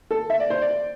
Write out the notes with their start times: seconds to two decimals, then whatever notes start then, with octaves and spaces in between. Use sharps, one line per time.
0.11 A4
0.30 E5
0.40 D5
0.50 C5
0.62 D5